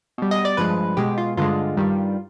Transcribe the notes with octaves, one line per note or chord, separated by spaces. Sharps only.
B2 G3
D#5
D5
G2 F3 G#3 B4
B2 G#3 G4
F4
G2 D3 G#3 F4
G2 D#3 G3